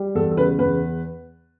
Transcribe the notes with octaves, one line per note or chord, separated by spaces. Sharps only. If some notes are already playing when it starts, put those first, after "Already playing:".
Already playing: G3
E2 A4
A4
C#3 B4
E2 B4